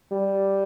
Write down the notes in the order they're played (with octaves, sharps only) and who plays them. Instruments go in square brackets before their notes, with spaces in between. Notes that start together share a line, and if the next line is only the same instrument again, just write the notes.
[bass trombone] G3